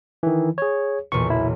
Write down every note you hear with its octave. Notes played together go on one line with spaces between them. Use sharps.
D#3 E3
G#4 C#5
B1 E2 A#2 C#6
E4